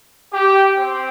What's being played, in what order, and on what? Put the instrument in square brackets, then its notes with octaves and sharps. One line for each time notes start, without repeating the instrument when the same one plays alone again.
[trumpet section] G4
C4